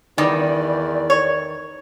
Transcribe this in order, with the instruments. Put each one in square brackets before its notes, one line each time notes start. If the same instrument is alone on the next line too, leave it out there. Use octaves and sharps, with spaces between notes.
[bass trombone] E2 [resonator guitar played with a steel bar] D#3 [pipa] G3 [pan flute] D5
[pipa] C#5